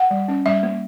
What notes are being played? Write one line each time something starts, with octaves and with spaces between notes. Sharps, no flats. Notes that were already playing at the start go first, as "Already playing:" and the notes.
Already playing: F#5
G3
C#4
G3 E5
A#3